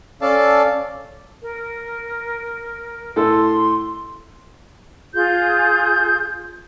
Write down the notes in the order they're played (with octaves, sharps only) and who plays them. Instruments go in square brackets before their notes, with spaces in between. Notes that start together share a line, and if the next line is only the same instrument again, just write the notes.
[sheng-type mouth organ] C#4 A4 D5 F5 A5
[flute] A#4
[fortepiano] A2 A4 [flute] C6
[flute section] F4 G#4 G6